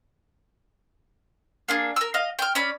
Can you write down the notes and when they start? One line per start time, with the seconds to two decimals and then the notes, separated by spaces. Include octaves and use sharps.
1.68 A#3 D4 G#4
1.96 A#4 E6
2.14 D#5 F5
2.39 G5 F6
2.55 C#4 D5 B5